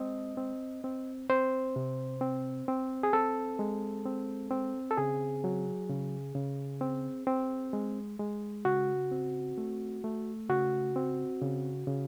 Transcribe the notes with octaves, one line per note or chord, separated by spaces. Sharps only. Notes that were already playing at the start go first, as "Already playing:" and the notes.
Already playing: G#3 C4 D#5
C4
C4
C4 C5
C3
C4
C4
G#4
C4 A4
G#3
C4
C4
A4
C#3 G#4
F#3
C#3
C#3
C4
C4
G#3
G#3
C#3 F#4
C4
A3
A3
C#3 F#4
C4
C#3
C#3